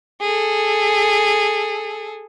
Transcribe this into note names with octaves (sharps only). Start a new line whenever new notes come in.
G#4 A4